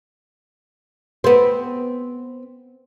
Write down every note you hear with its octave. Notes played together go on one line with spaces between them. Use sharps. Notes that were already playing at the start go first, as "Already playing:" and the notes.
B3 C4